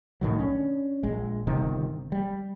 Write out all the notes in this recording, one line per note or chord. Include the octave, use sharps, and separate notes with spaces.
B1 A2 D#3 F#3
C#4 D4
A#1 G#3
G1 C3 D#3
G3